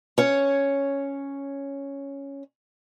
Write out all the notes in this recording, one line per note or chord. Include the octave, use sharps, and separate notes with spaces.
C#4 C#5